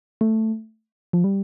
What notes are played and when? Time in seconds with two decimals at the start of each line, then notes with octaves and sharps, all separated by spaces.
0.21 A3
1.13 F3
1.24 G3